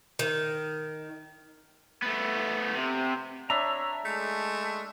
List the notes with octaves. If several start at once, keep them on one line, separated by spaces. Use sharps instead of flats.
D#3
A3 B3
C3
D4 C#5 E5 A#5 B5
G#3 A3